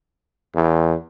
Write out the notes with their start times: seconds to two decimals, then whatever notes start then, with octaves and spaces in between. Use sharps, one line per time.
0.55 E2